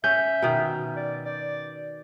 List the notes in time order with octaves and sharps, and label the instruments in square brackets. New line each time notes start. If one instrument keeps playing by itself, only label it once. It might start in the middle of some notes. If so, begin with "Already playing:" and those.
[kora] C#4 [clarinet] E5 [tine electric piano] G6
[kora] B2 D#3
[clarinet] D5
D5